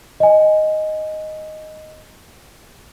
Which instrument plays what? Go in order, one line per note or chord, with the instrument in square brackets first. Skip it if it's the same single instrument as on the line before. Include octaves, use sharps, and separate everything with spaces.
[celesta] D#5 G#5